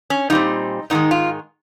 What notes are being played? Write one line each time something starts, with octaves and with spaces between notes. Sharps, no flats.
C#4
A#2 G3 C4 D#4
G#2 D#3 G#3 D#4
F4